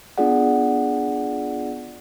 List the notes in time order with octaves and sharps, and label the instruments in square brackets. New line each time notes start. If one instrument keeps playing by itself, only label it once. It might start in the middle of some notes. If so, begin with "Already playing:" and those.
[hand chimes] B3 D4 F4 G#4 D5 F#5